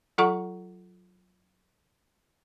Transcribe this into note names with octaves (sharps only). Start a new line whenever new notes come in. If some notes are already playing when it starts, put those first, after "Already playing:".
F#3 F4 A4 F#5 A#5 C#6